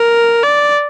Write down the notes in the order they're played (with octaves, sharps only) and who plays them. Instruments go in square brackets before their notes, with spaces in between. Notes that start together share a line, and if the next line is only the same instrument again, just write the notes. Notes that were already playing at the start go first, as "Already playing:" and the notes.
Already playing: [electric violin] A#4
D5